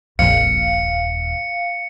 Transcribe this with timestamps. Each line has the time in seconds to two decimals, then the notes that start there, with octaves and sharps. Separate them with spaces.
0.19 D#1 A#1 F2 A#2 F5 C#7